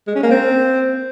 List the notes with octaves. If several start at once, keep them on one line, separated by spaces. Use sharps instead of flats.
G#3
C#4
A#3
C4